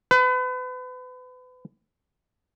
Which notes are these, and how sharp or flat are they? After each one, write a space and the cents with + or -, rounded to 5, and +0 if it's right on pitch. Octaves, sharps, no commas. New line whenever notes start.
B4 +35